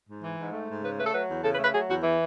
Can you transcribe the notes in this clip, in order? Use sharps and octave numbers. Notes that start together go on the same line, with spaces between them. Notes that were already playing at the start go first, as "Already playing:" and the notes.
G#2
E3
G#2
A3
G#2
C#3 B4
A3 B4
A4
F#3 B4
E2
C#3 A4
B4
A3
B4
F#3 G#4
E2 F#4
E3